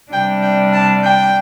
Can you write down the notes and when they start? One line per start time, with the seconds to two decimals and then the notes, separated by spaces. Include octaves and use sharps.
0.12 C3 G3 D4 G5
0.42 G5
0.72 A5
1.03 G5